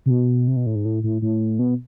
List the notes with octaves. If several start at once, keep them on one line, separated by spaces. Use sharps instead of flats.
C3
B2
C3
B2
A2
G#2
A2
A2
A2
B2